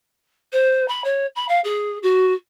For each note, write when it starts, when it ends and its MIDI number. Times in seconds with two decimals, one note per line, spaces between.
0.53 0.88 72
0.88 1.04 83
1.04 1.26 73
1.36 1.47 83
1.49 1.60 77
1.64 1.98 68
2.03 2.33 66